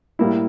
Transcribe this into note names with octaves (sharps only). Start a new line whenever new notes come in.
A2 G3 A#3 E4